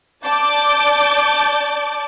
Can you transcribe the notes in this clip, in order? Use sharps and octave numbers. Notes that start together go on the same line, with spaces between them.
D5 A5 D6 G6